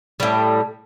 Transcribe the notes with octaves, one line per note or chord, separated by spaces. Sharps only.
A2 G3